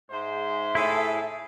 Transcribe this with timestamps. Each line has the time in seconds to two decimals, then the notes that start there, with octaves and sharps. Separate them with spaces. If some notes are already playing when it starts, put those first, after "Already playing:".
0.11 G#2 C5 E5
0.75 A2 E4 G#4 A4